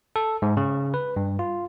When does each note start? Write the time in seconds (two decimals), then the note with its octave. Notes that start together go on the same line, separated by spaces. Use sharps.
0.16 A4
0.42 G#2
0.57 C#3
0.94 B4
1.16 G2
1.39 F4